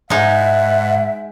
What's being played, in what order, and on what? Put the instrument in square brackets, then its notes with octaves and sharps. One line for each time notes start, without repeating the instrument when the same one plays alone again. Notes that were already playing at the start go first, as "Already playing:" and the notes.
[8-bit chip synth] G#2 [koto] G#3 D#4 [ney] E5 [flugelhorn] F#5